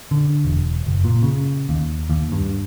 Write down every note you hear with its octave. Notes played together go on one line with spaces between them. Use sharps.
D3
E1
F#1
A#2
C#3
D#2
D#2
G2